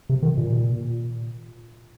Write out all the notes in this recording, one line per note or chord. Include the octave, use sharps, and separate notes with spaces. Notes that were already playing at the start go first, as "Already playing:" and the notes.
C3
D#3
A#2